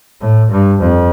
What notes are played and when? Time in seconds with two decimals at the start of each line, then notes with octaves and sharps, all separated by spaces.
0.21 A2
0.51 G2
0.80 F2